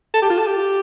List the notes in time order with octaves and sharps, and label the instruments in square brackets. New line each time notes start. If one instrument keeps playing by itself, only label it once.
[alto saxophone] A4
G4
F4
A4
G4